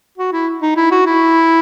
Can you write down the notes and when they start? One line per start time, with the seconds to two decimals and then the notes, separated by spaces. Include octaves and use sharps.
0.18 F#4
0.32 E4
0.62 D#4
0.76 E4
0.91 F#4
1.06 E4